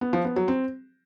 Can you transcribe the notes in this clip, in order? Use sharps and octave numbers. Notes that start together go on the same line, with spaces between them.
B3
F3
B3
F#3
C4